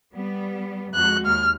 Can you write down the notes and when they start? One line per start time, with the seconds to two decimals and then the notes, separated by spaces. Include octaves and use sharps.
0.14 G3 B3
0.94 F2 G#3 F#4 F#6
1.26 D#2 F6